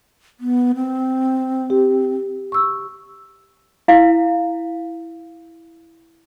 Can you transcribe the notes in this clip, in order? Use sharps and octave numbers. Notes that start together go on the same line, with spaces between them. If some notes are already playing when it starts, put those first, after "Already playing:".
B3
C4
G4
C#6 E6
E4 F5